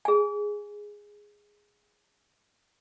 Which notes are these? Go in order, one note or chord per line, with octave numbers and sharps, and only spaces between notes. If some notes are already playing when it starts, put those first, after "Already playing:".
G#4 G#5